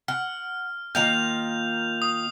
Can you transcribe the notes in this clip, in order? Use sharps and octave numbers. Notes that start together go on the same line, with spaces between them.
F#5 F6
D#3 A#3 F4 G6 F7
D#6